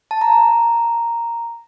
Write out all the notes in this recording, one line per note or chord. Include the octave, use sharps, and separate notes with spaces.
A5
A#5